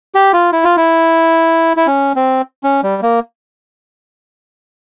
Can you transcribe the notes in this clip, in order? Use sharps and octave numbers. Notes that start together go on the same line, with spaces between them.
G4
F4
E4
F4
E4
E4
C#4
C4
C#4
G3
A#3